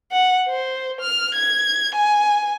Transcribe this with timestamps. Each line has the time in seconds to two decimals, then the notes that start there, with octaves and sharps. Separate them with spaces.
0.12 F#5
0.48 C5
1.01 F6
1.35 G#6
1.95 G#5